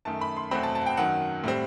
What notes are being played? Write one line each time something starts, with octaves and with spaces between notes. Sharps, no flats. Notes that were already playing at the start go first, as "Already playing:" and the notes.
F#2 D#3 A3 A5
B5
C6
E2 B2 F#3 A3 C4 B5
A5
A5
F#5
G5
F#2 D#3 F#3 F#5
A2 G3 C4